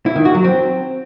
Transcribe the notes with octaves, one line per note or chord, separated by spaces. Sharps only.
E4
D#3
F#4
F#3
C4